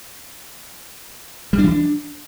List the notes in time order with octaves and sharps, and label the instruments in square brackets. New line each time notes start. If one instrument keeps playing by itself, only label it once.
[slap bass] G3
D4
E3
D4